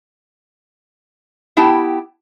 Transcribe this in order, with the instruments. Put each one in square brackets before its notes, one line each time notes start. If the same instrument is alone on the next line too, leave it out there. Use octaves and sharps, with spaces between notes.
[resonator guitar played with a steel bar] B3 E4 G4 G5 A5